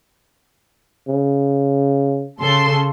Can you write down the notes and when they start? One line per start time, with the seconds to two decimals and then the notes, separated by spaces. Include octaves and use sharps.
1.08 C#3
2.40 C#3 A4 C6